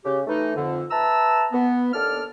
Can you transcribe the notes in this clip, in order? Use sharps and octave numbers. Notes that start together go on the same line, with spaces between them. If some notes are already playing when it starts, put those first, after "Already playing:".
C#3 G4
E3 A3 D#4
F2 D3
B4 E5 A5 A#5 E6
B3
D#2 D4 A4 D5 F6